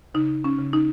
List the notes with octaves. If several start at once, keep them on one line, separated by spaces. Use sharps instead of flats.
C#3 D#4
C#4
C#3
D#4